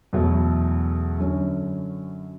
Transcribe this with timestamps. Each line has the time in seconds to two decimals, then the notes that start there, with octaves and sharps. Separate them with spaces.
0.13 E2 B2 F#3 A3 E4
1.18 F#2 D3 F#3 C#4